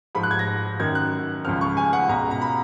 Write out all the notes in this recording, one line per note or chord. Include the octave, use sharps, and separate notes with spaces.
G#2 F3 B5
F#6
G#6
A#6
F#2 D#3 G#6
F#6
C#2 C#3 F3 F6
C#6
G#5
F#5
C#2 B2 A#5
A#5
B5